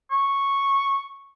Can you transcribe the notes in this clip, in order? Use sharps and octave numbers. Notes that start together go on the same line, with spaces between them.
C#6